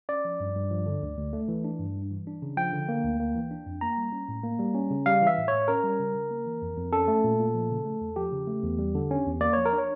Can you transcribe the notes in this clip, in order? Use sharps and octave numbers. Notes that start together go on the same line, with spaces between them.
C#4 D5
F3
G2
G2
F3
D3
D2
D2
A3
E3
D4
G2
G3
E3
D4
C#3
F3 G5
D3
A#3
D2
A#3
E3
D4
F2
A#3 A#5
G3
C#4
A2
A#3
G3
C#4
C#3
G3 F5
E3
E5
A2
A2 C#5
C#4 A#4
G3
C#3
C#3
A#3
E3
F2
F2
C#4 A4
A3
A#2
A#2
F3
C#3
A3
E2
F3 G4
C#3
A3
E2
G3
D3
C#4
E2
A#3 D5
F3 C#5
A#4
D4
C#5